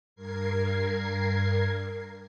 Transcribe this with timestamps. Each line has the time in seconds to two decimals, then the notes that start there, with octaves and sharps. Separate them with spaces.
0.15 G2 A#4 G#6 C7